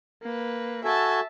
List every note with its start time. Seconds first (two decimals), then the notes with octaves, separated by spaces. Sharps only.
0.23 A#3 B4
0.84 F#4 A4 E5 G#5 A5